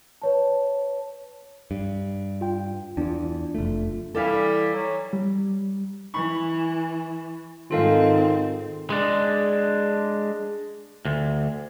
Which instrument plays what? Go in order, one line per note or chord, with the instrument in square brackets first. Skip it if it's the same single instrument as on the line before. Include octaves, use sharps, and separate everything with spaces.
[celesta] B4 C#5 A5
[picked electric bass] G2
[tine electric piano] F4 G5
[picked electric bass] E2 [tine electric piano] D4 F4
[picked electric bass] F1 A3
[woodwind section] E3 G3 E4 [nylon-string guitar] A4 E5 F5
[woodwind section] F#3
[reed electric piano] G3
[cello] E3 [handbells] B5 C#6
[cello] G#2 C4 [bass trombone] D#3 [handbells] F4 A4 F5
[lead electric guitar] G#3 D4
D2